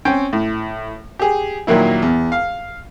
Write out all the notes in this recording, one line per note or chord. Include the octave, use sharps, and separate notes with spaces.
C4 C#4 G5
A2
G4 G#4
A#2 D#3 F#3 A#3 E4
E2
F5